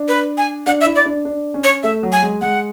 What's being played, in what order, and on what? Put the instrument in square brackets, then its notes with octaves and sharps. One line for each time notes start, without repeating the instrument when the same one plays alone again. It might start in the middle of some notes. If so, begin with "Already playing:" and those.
Already playing: [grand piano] D4
[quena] B4
G#5
[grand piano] D4 [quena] F#5
[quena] E5
[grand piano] E4
[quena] D5
[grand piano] D4
D4
C#4
[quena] C#5
[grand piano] A3 [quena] E5
[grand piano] F#3
[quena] G#5
[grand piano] G#3
[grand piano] G#3 [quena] F#5